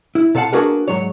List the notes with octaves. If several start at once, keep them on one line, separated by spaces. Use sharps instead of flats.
E4
C3 A4 F5 F#5 A5
A#3 D4 F#4 G#4 A#4 B4
G#2 F#3 C#5